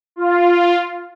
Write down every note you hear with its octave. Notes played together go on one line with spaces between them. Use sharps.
F4